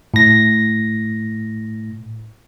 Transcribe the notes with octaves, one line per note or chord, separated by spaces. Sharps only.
A2 A#6